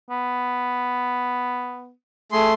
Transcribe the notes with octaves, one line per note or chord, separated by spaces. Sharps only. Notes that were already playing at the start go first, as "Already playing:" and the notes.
B3
A3 G#4 C6